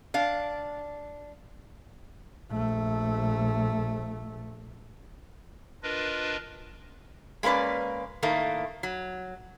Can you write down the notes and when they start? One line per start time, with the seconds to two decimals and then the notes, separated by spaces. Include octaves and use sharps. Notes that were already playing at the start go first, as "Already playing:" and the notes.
0.14 D4 F5
2.51 A#1 A3
5.83 D4 F4 A#4 B4 D#5
7.43 G#3 A#3 C#4 B4 D5
8.22 A2 D#3 A3 A#3
8.83 F#3